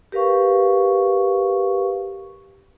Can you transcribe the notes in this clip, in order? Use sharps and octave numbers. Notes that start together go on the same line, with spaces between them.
G4 A#4 B4 F5 C#6